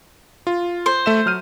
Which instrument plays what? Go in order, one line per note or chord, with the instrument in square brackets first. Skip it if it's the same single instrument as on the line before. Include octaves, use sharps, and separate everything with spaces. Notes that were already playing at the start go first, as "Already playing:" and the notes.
[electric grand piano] F4
[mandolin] C5
[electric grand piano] A3 E5 E7
F#3 F6 D#7